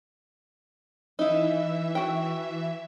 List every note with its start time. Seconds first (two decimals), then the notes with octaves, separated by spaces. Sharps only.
1.19 E3 D#4 E4 E5
1.95 F#4 G5